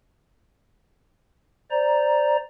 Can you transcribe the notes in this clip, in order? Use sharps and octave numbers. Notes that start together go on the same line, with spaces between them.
C5 D5 A#5